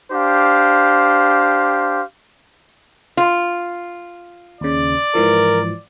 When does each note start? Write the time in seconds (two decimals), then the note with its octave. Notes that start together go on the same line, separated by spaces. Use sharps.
0.12 D4 G4 C5 F5
3.17 F4
4.61 D#2 C#3 D5
5.15 G#2 E3 F3 A#4